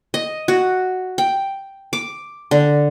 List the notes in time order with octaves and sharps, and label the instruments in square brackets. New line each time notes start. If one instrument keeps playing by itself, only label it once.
[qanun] D#5
F#4
G5
D6
D3